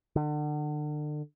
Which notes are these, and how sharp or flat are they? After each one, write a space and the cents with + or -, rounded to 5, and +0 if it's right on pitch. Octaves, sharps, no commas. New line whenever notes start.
D3 +35